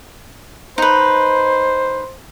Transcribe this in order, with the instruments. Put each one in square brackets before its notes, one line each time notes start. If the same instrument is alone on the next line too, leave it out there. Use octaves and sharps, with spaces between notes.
[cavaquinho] D#4 B4 [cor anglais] C5